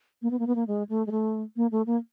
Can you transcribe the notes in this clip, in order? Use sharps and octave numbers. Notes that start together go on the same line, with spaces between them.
A#3
B3
A#3
B3
A#3
G#3
A3
G#3
A3
A#3
A3
A#3